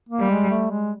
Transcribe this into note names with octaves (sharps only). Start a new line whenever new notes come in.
A#3
G3
G#3
A3
G#3